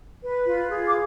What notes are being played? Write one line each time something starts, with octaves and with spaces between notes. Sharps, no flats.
B4
F4
G#4
D6